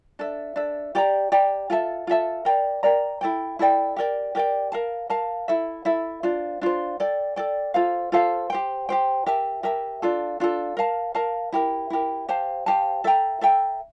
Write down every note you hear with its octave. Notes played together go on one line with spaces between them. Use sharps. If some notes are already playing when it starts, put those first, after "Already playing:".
D4 A4 E5
D4 A4 E5
G4 D5 G5 A#5
G4 D5 G5 A#5
F4 A4 E5 A5
F4 A4 E5 A5
A#4 D5 G5 A#5
A#4 D5 G5 A#5
E4 A4 D5 G5
E4 A4 D5 G5
G4 A#4 D5 G5
G4 A#4 D5 G5
A#4 F5 A5
A#4 F5 A5
E4 A4 E5
E4 A4 E5
D4 F4 C5
D4 F4 C5
A4 D5 G5
A4 D5 G5
F4 A4 C5 F5
F4 A4 C5 F5
G4 C5 G5
G4 C5 G5
G4 A#4 E5 A5
G4 A#4 E5 A5
D4 F4 A4
D4 F4 A4
A#4 F5 A5
A#4 F5 A5
E4 G4 A#4
E4 G4 A#4
G4 C5 F5 A5
G4 C5 F5 A5
A4 E5 G5 A#5
A4 E5 G5 A#5